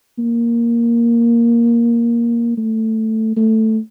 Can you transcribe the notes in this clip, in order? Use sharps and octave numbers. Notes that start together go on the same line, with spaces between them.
A#3
A3
A3